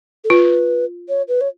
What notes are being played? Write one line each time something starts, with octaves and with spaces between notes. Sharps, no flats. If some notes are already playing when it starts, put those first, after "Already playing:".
A4
F4 B4
C#5
B4
C#5